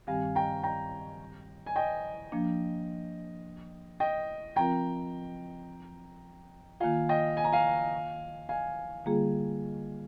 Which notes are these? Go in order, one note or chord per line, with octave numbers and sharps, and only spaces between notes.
G2 D#3 G3 C4 G4 F5 G#5
G5 A#5
G5 A#5
G#5
D#5 G5
F3 A#3 D4
D#5 G5
F3 C4 F4 A#4 G5 A#5
D#3 A#3 F4 F5 G#5
D#5 G5
G#5
A#5
F5 G#5
F5 G#5
D3 G3 A#3 F4 G#4